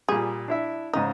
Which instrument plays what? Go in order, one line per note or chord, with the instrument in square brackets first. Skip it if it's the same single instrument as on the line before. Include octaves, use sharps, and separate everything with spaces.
[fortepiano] A#2 G3 [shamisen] G#4
[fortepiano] D4 E4 E5
[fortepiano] G#2 C#3 D#6 [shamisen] D#4